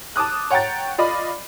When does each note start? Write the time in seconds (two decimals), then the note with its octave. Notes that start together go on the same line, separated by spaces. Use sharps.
0.16 A5 D6 D#6 F#6
0.50 C#5 F#5 G5 A#5 A6
0.98 F4 D5 D#5 B5